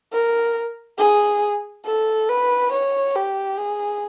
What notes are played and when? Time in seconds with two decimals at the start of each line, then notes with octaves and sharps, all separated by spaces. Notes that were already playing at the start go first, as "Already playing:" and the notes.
0.12 A#4
0.98 G#4
1.85 A4
2.29 B4
2.72 C#5
3.15 G4
3.58 G#4